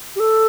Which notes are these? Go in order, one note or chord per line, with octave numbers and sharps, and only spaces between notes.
G4
A4